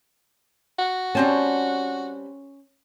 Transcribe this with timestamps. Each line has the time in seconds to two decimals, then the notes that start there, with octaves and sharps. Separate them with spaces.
0.79 F#4
1.15 G3 C4 C#4 A5